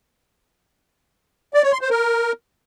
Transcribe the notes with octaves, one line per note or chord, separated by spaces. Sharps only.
D5
C#5
C6
C5
A#4